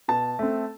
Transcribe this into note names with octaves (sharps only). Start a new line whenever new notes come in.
B2 A5
A3 C4